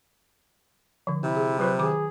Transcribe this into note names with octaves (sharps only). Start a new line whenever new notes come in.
D3 F3
C3 E4
G#4
F#3 F4 B4 C5
D#3 G#4 D6